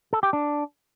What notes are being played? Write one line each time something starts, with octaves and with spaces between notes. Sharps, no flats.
A4
G4
D4